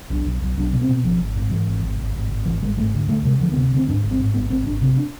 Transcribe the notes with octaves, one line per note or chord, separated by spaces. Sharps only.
B1 D4
B1
B1
B1 D4
B2
C4
B2
G#1 F3
G#1
G#2
G#2 E3
G#1
G#1
G#1
G#1
G#1
G#1 E3
G#1 G#3
G#2 A3
D2
D2 A3
C3 G#3
D2 F3
B3
C3
D2
C4
G#2 D4
G#1
C4
G#2
G#1 B3
G#1 C4
G#1 D4
C3 C4
D4